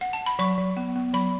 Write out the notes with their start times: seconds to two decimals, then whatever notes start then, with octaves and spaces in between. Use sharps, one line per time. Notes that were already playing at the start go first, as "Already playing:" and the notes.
0.01 F#5
0.13 A5
0.26 B5
0.39 F#3 C#6
0.58 F#3
0.77 B3
0.96 B3
1.14 F#3 B5